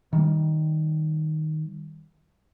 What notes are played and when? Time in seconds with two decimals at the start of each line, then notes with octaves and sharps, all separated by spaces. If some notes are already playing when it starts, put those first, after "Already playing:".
0.13 D#3 G3